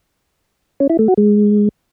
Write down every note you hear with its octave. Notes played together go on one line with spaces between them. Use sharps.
C#4
E4
A3
F#4
G#3